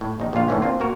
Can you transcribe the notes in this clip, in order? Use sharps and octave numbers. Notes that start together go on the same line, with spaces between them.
A2
A#1 D#3 D#4
A#1 A#2 D3 F4 F5
A2 D3 E3 A3 B3 C#4
A#3 C4 D4 F4
A#2 A#3 F#4 A#4